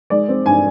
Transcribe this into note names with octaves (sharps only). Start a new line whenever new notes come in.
G#3 D5
C4
G2 G#5